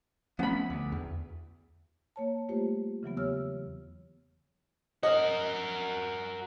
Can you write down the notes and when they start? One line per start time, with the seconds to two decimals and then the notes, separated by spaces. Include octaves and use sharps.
0.39 F3 A3 B3 C#4 B5
0.70 D2
0.92 E2
2.16 A#3 C#5 A5
2.49 G3 A3 A#3 F4 G4 C5
3.03 C#3 E3 F#3 B3
3.17 E2 G4 C#5 E6 F6
5.03 F#4 A#4 D#5